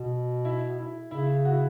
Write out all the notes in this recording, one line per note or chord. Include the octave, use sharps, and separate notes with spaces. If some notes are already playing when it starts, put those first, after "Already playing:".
Already playing: B2
E4
E4
C#3 E4
F#4
E4